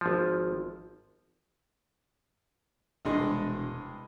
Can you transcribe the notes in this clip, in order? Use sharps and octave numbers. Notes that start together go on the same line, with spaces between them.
G#1 F3
E1 C2 G2 G#3